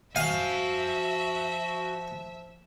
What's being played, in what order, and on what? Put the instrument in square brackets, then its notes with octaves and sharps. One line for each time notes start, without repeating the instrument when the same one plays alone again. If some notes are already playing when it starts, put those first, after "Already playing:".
[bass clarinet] F3 [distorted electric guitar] F#4 G#5 [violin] E5 [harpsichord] F5